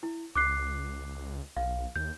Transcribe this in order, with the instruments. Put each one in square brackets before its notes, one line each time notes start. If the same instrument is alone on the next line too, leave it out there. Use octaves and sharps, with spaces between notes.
[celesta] E4
[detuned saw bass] C#2 [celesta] D6 F#6 C7
[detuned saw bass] B1 [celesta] F5
[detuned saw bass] D#2 [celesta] G6